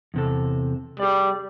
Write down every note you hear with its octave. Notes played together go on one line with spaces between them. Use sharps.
E2 C3 A4
G3 G#4 D5